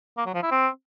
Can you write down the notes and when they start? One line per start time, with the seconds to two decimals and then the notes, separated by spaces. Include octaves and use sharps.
0.17 A#3
0.26 F#3
0.34 F3
0.43 E4
0.51 C4